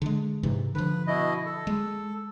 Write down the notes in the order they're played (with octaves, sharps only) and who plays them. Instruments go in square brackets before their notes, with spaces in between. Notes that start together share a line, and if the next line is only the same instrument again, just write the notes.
[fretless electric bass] D3 G#3
G#2 C3 E3
[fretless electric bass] D3 F3 [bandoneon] B4
[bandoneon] B2 E4 D#5
A4
[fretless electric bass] G#3